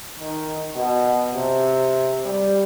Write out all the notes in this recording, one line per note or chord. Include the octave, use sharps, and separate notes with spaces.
D#3
B2
C3
G3